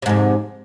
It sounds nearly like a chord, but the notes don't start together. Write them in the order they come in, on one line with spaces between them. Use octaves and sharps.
C3 G#2 F2